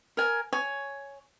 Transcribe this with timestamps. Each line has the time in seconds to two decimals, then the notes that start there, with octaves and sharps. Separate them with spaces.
0.17 A#4 G#5
0.53 C#5 G#5